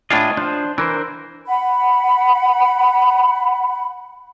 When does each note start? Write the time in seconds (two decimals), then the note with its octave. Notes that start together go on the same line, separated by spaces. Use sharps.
0.10 A2 D4 F4 D#5 G#5
0.37 F3 D4 C5
0.78 E3 D4 A#4 C5
1.47 F#5 B5